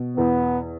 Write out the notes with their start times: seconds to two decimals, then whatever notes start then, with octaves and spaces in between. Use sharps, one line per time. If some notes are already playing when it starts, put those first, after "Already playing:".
Already playing: B2
0.17 E2 B3